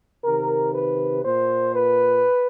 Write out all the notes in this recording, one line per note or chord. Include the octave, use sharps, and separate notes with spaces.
C3 D#3 A#4
B4
A#2 C5
B4